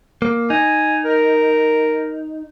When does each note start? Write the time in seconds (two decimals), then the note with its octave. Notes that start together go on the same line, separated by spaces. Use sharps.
0.22 A#3
0.50 D#4 G#5
1.05 A#4